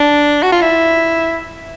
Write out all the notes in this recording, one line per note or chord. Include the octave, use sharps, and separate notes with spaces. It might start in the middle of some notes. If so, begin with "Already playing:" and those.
Already playing: D4
F#4
F4
E4